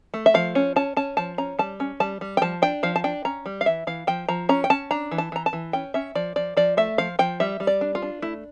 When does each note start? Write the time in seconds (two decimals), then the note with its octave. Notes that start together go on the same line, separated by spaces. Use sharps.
0.14 A3
0.26 E5
0.34 F3 F5
0.55 C#4
0.76 C#4 A5
0.97 C#4 A5
1.17 F3 A5
1.38 C#4 A#5
1.59 G3 A5
1.80 C#4
2.00 G3 A5
2.21 G3
2.37 G5
2.42 F3 A5
2.62 D4 G5
2.83 F3 F5
2.96 A5
3.04 D4 G5
3.25 C#4 A#5
3.46 G3
3.61 F5
3.66 E3 E5
3.87 E3 F5
4.07 F3 G5
4.29 F3 A#5
4.49 C#4 A#5
4.64 G5
4.70 C#4 A5
4.91 D4 A#5
5.11 E3
5.18 A5
5.32 E3 A#5
5.46 A5
5.53 E3
5.73 C#4 G5
5.94 C#4 E5
6.15 F3 D5
6.36 F3 D5
6.57 F3 D5
6.77 A3 E5
6.98 F3 F5
7.19 F3 G5
7.40 G3 E5
7.60 G3
7.67 D5
7.81 D4
7.95 F4
8.02 D4
8.22 A3 E4